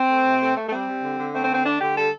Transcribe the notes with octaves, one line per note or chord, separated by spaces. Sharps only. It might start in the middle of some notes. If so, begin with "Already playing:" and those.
Already playing: C4
A3
C3
A3
A3
A3
G3 C4
G3
D3
D3
A3 C4
C4
D3
C4
A3 D4
D3 G4
G3 A4